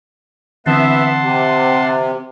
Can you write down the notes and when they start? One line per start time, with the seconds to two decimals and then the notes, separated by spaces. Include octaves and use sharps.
0.66 D3 E3 B3 C4 E5 F#5 A5 C6
1.23 C3